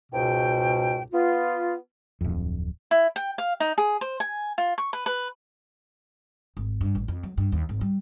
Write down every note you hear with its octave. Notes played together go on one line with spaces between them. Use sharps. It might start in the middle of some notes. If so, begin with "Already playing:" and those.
C#2 G#2 B2 G5
B3 F4
D1 F2
E4
G5
F5
D#4
G#4
C5
G#5
F4
C#6
B4
B4
G#1
G2
A1
F2
F#3
G2
D#2
G#1
G3